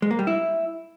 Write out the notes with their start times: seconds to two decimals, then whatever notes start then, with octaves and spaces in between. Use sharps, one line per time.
0.02 G#3
0.11 A#3
0.19 G3
0.27 E4